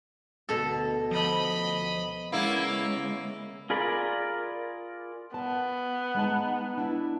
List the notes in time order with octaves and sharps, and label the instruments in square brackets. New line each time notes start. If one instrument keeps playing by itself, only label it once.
[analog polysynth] D2 [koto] B2 A4
[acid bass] F3 [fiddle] D#5 B5
[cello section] C#3 G#3 [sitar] A#3 B3 E4
[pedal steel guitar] F4 G#4 A#4 D5 B5
[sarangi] B3 [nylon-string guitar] A5
[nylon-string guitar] G#3 D#4 A5
D4 E4